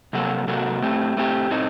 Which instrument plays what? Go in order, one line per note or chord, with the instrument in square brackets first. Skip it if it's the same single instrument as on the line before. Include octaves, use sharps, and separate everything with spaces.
[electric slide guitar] C3 F#3 A#3 F#4 A4
C3 F#3 A#3 F#4 A4
A2 A3 C4 G4
A2 A3 C4 G4
A2 A3 C4 D#4